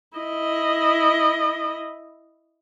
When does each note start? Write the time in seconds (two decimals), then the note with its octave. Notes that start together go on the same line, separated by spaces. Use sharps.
0.18 E4 D#5